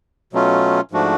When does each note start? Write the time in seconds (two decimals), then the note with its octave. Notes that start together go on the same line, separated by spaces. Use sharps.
0.33 B2 F#3 A3 C#4 F4
0.91 G#2 F3 A3 D4 F#4